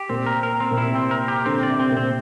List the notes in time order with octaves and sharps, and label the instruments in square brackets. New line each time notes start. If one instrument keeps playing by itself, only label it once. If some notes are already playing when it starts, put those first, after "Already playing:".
Already playing: [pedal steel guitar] G4
[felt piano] A#2 [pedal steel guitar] C4
[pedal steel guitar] A#4
A#4
C4
[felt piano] A#2
[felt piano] C3 [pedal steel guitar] E4
[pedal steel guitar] C4
A#4
G4
[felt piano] D3 [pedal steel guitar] C4
[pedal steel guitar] D5
[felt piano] C3
[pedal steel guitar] C4
[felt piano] A#2
[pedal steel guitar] C4